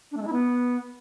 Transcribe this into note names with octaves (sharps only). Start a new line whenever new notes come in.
D4
A3
G#3
E4
B3